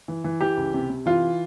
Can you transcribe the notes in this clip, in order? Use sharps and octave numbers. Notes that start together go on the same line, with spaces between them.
E3
E3
E3 G4
C#2
C3
C3
E3 F4